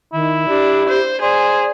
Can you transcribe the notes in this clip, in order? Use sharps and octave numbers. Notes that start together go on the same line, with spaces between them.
D#3 E4
D4 G4
C5
G#4 C5 D5